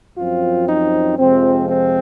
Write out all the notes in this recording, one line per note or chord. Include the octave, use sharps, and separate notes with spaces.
F#2 F3 C4 F4
D#4
F2 C3 F3 G#3 C4
C4